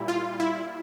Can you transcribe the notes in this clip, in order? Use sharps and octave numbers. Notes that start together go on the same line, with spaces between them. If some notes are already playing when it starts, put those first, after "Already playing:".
Already playing: A#2 G3 E4
F4
E4